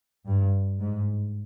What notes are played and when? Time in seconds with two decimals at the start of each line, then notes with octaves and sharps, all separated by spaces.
0.27 G2
0.80 G#2